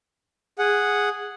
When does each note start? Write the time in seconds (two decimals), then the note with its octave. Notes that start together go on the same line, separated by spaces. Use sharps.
0.58 G#4 F#5